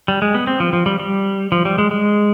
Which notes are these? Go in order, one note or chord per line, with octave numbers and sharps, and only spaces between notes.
G3
G#3
B3
C4
F3
F3
G3
G3
F3
G3
G#3
G#3